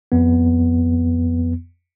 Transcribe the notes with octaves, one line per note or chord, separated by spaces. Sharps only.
F2 B3